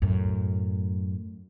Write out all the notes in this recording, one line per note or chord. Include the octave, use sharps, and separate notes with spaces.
F#2 A2